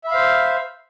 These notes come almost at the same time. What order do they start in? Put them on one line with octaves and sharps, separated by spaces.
E5 B5 F5 C5